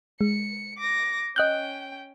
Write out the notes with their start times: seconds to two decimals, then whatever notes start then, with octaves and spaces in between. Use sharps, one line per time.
0.21 G#3 C#7
0.77 D6 A#6
1.36 C#4 D#5 G5 F#6 G6